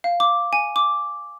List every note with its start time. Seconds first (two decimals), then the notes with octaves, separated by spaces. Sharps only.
0.04 F5
0.20 D6
0.53 G#5
0.76 D6